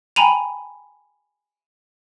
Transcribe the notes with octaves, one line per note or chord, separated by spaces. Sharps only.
G5 G#5 A#5 B5 D#7 F7